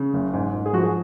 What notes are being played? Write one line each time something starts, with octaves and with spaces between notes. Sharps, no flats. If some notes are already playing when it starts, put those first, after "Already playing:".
Already playing: C#3
F#1
G#2
G#2
G#4
F3 F#4
G#4